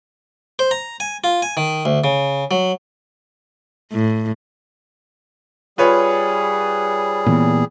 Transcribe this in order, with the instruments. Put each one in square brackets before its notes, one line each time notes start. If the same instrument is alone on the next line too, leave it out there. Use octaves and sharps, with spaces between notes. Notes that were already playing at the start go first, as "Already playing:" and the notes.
[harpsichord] C5
A#5
G#5
F4
G#5
D#3
D2
C#3
F#3
[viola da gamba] A2
[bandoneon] G3 G#4 [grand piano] F4 B4 C#5
[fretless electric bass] A#2 E3 B3